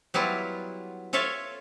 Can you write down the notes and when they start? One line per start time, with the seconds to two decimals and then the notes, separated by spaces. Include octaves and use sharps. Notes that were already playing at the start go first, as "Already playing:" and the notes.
0.14 F#3 G3 B3 E4 F4
1.13 F4 A4 C#5 E5 F5